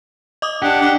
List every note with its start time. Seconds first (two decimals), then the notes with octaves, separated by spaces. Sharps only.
0.42 D#5 D6 D#6
0.62 D4 G4 F#5
0.82 D4 G5 D6